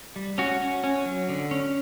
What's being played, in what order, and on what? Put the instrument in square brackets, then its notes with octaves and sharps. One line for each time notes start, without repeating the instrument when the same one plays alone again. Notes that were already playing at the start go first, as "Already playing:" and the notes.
[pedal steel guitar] G3
C#4 F#4
C#4
C#4
F#3
D3
C#4